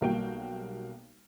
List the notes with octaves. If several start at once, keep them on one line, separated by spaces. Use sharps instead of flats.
B1 G3 A#3 F#4 G5